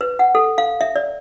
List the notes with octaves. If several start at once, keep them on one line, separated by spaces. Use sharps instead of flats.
B4
F#5
A4
F5
E5
D5